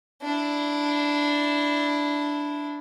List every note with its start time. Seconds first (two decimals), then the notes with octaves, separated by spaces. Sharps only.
0.22 D4 E4